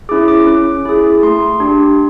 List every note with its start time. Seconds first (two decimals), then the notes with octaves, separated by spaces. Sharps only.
0.09 C#4 E4 G#4 D6
0.28 D6
0.47 C#4
0.85 E4 G#4
1.23 A3 C6
1.60 D4 G4